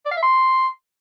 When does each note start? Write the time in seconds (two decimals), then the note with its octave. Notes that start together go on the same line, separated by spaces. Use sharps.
0.06 D5
0.11 F5
0.17 E5
0.23 C6